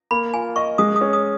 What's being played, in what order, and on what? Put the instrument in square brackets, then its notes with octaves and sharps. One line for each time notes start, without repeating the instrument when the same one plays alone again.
[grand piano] A#3 [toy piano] B5
[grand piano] F4 [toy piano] G#5
[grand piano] D#5 [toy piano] C#6
[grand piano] G#3 [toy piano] D#6
[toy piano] D#6
[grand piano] C#4
[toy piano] D#6